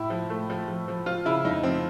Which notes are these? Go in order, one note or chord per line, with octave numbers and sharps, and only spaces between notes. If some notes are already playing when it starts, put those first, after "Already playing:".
Already playing: A2 E4
F3
A3
F3
F3
F3
F3 F4
C#3 E4
F2 D#4
F3 C4